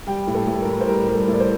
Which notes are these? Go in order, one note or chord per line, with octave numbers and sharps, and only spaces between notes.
G3 G5
A2
A4
A2
A#4
A2
C5
G3 A#4
G3
A4
A2 D5
C5